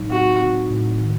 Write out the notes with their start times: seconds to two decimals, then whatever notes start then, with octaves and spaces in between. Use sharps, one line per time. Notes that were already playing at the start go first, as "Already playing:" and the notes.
Already playing: A2 F#3 D#4
0.10 C4 F#4
0.40 C4
0.70 A2
1.01 D#3